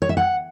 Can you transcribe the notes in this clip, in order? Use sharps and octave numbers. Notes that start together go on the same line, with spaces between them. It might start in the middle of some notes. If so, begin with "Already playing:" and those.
C#5
E5
F#5